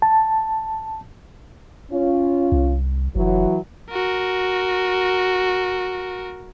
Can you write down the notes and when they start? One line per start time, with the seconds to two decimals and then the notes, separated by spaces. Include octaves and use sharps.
0.02 A5
1.91 C#4 F4
2.52 C2
3.15 F1 E3 F#3
3.91 F#4 A#4